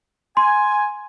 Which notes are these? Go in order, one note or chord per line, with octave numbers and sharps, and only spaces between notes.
G#5 C6